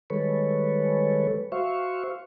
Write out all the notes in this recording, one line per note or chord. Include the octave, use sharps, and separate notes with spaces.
D#3 G3 G#3 A4 B4 C#5
F#4 C5 E5 F5 C#6